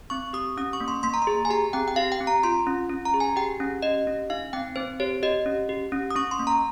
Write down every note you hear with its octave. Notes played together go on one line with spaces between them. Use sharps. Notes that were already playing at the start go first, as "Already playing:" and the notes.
C4 C#6
G4 D#6
C#4 D#6
C#6
A#3
C6
A#3 C6
A#5
C6
G#4
G#5
G4 A#5
C4 G5
G5
G4 F5
G5
C4
A#5
F4 C6
C#4
C#4
A#5
G#4
G#5
G4 G5
C#4
G4 D#5
C#4
D#4 F5
C4 G5
C4 C5
G4 C#5
G4 D#5
C#4
G4
C#4
D#6
C#4 C#6
C6
A#3
A#5